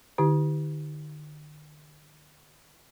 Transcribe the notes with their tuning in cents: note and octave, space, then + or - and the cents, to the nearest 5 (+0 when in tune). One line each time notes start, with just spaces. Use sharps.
D3 +40 E4 -35 G4 +0